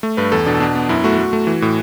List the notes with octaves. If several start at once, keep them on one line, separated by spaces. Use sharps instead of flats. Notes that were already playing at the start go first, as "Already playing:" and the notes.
A3
G2 B4
E2 A4
B2 D4
B2 D4
B3
F#2 E4
A3 F#4
A3
A3
E3
A2